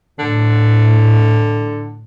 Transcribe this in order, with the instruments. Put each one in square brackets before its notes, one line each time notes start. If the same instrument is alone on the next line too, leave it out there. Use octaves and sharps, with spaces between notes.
[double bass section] A2 [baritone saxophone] D3